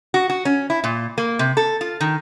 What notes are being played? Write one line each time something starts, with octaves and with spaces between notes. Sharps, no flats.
F#4
F#4
C#4
E4
A#2
A#3
C3
A4
F4
D#3